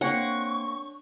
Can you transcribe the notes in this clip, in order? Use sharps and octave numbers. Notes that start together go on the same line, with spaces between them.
A#3 C4 D4 C#5 F#5 C#6